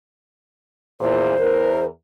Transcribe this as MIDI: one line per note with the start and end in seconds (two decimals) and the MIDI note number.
1.01 1.36 40
1.01 1.36 46
1.01 1.84 72
1.39 1.86 40
1.39 1.86 70